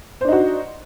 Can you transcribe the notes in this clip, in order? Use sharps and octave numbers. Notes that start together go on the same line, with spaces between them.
D4 D#4 F#4 C5